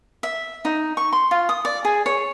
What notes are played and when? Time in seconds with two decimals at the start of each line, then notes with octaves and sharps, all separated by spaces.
0.23 E5
0.65 D#4
0.97 C#6
1.13 C6
1.31 F4
1.49 D#6
1.65 D5
1.85 G#4
2.06 C#5